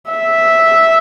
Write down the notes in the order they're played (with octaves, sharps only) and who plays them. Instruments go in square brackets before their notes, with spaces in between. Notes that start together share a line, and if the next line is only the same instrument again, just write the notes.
[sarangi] E5